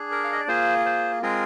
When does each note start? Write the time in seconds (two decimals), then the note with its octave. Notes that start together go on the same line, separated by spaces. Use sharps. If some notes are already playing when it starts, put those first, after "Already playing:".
Already playing: D4 G#4
0.11 A#4
0.24 F5
0.33 D#5
0.40 D5
0.48 A#3 F4 G#4 C5
0.85 C5
1.22 G#3 C4 F4 G#4 A#4